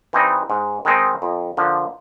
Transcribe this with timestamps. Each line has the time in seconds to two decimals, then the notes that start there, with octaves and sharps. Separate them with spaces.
0.13 E3 G3 C4 D#4
0.50 G#2
0.85 D#3 G#3 C4 D#4
1.22 F2
1.57 D3 F3 A#3